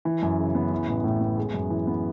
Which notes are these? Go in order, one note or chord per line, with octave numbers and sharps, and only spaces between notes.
E3
F#2
C#3
B3
E3
A1
A2
B3
G#3
F#2
E3
B3